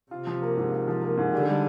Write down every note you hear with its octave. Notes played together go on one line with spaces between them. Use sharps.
C3 F4
F3
A#3
G#2
F4
F3
A#3
G#2
D3 G4
G3